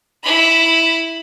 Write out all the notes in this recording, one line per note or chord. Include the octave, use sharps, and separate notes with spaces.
E4 B5